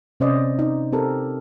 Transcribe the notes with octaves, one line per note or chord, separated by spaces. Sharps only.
C3 C#4 C5 D5 D#5
D#4
C4 G4 A4 A#4